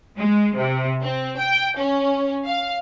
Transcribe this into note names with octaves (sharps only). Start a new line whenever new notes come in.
G#3
C3
C4
G5
C#4
F5